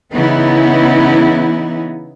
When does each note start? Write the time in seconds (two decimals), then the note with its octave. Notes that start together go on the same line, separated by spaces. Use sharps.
0.12 C#3 E3 B3 D#4 E4